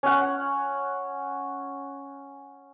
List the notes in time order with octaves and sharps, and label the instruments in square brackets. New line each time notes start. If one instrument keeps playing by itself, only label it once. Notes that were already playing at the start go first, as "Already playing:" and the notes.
[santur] C#4 F#5